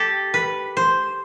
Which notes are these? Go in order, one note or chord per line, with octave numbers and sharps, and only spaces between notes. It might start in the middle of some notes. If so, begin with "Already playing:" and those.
Already playing: G4 A4
B4
C5